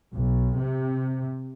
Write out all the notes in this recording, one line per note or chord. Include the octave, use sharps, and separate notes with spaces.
B1
C3